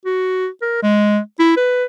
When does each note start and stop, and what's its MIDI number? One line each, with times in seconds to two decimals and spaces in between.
0.05 0.48 66
0.62 0.78 70
0.83 1.19 56
1.39 1.53 64
1.57 1.85 71